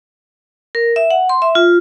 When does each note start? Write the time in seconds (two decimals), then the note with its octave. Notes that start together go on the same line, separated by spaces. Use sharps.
0.75 A#4
0.96 E5
1.11 F#5
1.29 C6
1.42 E5
1.55 F4